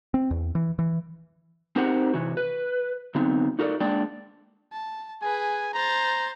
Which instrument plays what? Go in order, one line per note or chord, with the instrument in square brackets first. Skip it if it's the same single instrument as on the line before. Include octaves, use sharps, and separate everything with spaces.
[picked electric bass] C4
E2
E3
E3
[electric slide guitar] C4 D#4 G4 A#4 C5 F#5
C3 E3 F#4
B4
D3 F#3 B3 C4 D#4
D#4 F#4 A4 A#4 C#5 D5
G#3 A#3 D4 D5 G5
[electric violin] A5
[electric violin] G#4 B4 [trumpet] G#5
[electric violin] C5 A6 [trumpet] A#5